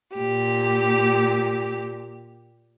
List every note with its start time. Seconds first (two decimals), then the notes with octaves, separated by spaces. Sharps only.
0.15 A#2 G4